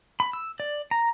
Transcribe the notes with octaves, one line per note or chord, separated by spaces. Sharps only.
B5
E6
D5
A#5